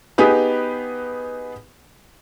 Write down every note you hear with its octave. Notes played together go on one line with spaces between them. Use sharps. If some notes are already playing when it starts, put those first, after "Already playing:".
B3 D#4 G4 G#4 B4